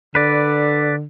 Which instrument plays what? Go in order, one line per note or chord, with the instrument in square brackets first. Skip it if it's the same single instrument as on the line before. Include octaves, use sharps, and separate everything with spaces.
[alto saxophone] D3 [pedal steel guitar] B4 D5